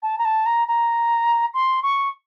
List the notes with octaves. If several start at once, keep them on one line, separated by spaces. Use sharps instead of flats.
A5
A#5
A5
A#5
A#5
C6
C#6